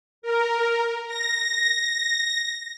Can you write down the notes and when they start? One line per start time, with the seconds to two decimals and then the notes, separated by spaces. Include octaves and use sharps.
0.22 A#4
1.07 A#6